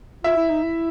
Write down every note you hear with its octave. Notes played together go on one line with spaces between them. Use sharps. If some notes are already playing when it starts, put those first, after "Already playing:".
F4 E5
E4
D#4
E4